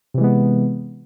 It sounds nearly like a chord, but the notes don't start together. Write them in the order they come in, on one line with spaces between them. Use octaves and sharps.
C3 E3 G#3 B3